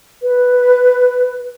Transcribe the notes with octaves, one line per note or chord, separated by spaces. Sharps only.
B4